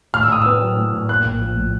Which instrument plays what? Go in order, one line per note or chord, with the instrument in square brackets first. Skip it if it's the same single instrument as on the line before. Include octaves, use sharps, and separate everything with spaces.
[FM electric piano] A2 [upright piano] F6
[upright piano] E6
[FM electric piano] A2 [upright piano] D#6
[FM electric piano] B3 [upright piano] E6
[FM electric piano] F#3
A2
A2
[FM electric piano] A#3 [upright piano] F#6
[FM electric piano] A#1
F3
A2